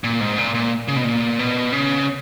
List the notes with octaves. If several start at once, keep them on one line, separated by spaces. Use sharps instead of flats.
A#2
G#2
A#2
A#2
C#3
B2
A#2
B2
C#3